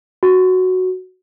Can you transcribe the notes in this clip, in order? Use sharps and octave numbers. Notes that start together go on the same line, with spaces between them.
F#4